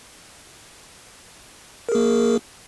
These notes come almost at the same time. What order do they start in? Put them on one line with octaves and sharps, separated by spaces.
A#4 G#4 A#3